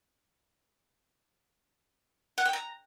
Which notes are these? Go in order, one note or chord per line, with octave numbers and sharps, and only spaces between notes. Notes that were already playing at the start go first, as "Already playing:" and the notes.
F#5
G5
A#5